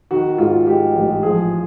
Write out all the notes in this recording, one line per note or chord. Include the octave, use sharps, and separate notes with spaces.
D#3 F#4
G#2 F4
G#3 G4
A1
F3 G#4